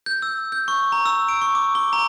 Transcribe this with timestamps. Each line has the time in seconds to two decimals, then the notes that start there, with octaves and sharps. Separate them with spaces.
0.06 G6
0.22 E6
0.52 G6
0.68 C#6
0.92 A#5
1.05 E6
1.29 D7
1.42 C#6
1.55 D6
1.75 G7
1.93 A#5